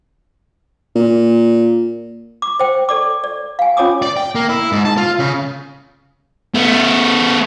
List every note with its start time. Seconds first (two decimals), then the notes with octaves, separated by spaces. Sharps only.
0.95 A#2
2.42 D6
2.60 C5 G5
2.89 A4 D5 D6
3.24 D5
3.59 F5 G#5
3.77 C#4 F4 C#5 G#5 D6 D#6
4.02 D5
4.17 G5
4.35 A#3
4.49 E4
4.72 G#2
4.85 A5
4.98 F4
5.19 C#3
6.55 A3 B3